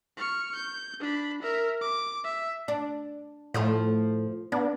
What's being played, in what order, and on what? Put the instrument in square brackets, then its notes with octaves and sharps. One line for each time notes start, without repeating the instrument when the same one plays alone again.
[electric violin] C#6 F6
G6
D4 B5
A#4 E5
D6
E5
[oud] D4
[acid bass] A2 [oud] F3 A3 F4
[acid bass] B3 [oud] D4